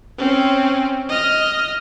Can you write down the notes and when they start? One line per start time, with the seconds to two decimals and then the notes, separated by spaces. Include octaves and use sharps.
0.18 C4 C#4
1.09 D#5 F6